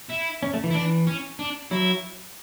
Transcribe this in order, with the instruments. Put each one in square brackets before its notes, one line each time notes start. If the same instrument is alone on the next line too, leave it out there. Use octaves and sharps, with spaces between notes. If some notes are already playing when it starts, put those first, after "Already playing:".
[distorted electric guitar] E4
[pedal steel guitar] C#4
A3
E3
[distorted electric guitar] E4
[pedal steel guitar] E3 [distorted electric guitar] D4
[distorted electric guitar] C#4
D4
[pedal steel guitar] F#3 [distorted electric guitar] E4